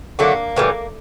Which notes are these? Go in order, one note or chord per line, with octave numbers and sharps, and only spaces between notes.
D3 F#3 A3 A#3
A2 E3 G3